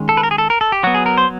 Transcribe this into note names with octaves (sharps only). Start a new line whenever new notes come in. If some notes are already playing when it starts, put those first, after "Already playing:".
Already playing: D#3 G#3 C#4
A4
B4
A#4
G#4
A4
A#4
A4
G4
F#3 B3 F#4
G#4
A#4
C5